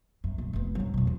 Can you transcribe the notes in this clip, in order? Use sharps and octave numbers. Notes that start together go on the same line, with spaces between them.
F#2
A#2
F1 B3
G#2 F#3
F2 B2
D#2 E3